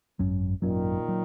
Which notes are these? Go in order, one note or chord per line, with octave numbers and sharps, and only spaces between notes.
G#1 F#2 F#3 C#4
G#1 F#2 A#2 D#3 F#3 C#4
F#3